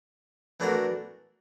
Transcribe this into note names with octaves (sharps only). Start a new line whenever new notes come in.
E3 A3 D4 F#4 A#4